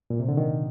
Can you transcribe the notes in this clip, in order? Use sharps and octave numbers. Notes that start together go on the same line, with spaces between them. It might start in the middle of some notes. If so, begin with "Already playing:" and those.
A#2
C3
D3
D#3